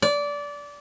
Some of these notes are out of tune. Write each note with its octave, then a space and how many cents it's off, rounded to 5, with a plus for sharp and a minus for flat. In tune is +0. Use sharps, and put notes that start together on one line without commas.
D5 -20